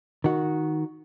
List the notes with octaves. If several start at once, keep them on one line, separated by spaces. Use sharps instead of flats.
D#3 F#4